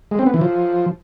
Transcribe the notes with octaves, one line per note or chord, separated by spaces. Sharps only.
G#3
C4
B3
E3
F3